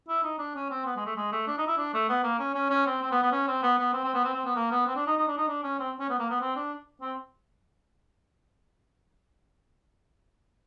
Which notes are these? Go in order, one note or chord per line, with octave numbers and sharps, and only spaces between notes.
E4
D#4
D4
C#4
C4
B3
G#3
A3
G#3
A3
D4
D#4
E4
D4
A3
B3
A#3
C#4
C#4
C#4
C4
C4
B3
B3
C#4
C4
B3
B3
C4
C4
B3
C4
C4
B3
A#3
B3
C4
D4
D#4
D#4
D4
D#4
D4
C#4
C4
C#4
B3
A#3
B3
C4
D4
C4